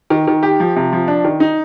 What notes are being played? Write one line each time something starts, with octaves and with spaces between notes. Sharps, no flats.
D#3
D#3
G4
F3
C3
F3
D4
D#3
D#4